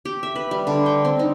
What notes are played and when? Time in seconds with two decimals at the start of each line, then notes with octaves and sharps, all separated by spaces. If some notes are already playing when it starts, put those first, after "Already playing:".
0.05 G4
0.23 E5
0.36 B4
0.51 G3
0.67 D3
0.86 G5
1.05 C4
1.19 D#4